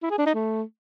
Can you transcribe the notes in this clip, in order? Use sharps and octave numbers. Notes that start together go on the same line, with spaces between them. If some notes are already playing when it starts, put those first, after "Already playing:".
E4
G#4
D4
D#4
A3